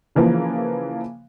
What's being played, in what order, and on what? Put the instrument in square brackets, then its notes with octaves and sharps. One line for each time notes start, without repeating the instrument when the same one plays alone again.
[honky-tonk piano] C#3 E3 F3 A#3